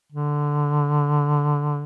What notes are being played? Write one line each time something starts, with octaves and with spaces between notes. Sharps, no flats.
D3